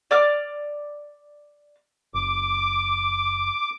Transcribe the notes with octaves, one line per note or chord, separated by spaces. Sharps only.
D5 D6 F6
F#1 D6